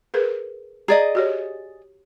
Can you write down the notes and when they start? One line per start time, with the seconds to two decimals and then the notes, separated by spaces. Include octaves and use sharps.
0.14 G#4 A#4 B4
0.88 G#4 D5 D#5 A#5
1.15 F#4 G4 C#5